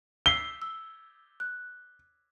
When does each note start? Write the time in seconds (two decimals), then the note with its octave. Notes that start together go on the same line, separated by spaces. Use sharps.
0.26 E6 B6 C7 G7
0.62 E6
1.40 F#6